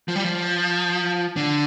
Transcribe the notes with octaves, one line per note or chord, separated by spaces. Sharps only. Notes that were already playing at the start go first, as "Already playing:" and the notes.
F3
G3
F3
D3